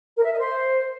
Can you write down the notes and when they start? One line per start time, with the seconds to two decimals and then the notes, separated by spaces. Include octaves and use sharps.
0.17 A#4
0.24 E5
0.32 D#5
0.39 C5